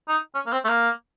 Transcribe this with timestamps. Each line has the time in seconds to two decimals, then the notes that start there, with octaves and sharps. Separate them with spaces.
0.08 D#4
0.35 C#4
0.46 A#3
0.52 C4
0.64 A3
0.68 A#3